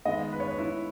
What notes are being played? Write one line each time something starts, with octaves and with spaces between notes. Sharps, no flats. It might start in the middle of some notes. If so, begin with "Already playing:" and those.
D#3 G#3 B3 D#5
B4
C#5
B4
E4